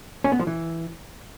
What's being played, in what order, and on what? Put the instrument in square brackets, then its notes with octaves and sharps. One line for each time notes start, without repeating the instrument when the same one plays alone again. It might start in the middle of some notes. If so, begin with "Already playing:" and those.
[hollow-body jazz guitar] C#4
B3
F3
E3